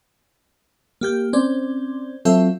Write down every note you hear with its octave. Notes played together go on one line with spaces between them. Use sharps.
A#3 G4 G6
C4 C#4 C5 D5
F#3 C4 F4 A4 E5